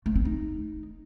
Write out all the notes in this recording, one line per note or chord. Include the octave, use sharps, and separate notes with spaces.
A3
C4
D#4